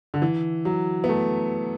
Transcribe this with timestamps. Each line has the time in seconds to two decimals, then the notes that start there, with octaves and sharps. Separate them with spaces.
0.14 D3
0.22 E3
0.65 F#3
1.04 B3
1.09 A3